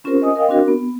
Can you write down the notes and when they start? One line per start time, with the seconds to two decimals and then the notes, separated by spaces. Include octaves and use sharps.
0.04 C4 C#4 F4 G4 A#4 C5
0.22 D#5 G#5 D#6
0.36 A#4 D#5 F5 G5
0.49 C4 D4 F#4 A#4
0.68 B3